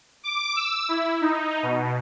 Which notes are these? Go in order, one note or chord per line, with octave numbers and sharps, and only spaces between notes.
D6
E6
E4
D#4
B2